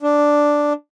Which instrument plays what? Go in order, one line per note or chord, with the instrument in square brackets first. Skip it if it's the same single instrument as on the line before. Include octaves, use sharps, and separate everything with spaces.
[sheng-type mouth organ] D4